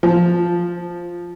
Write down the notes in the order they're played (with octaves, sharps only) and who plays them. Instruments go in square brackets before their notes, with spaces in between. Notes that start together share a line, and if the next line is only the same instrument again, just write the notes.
[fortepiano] F3